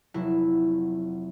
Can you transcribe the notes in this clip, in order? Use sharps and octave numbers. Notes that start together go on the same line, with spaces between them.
F1 F#3 E4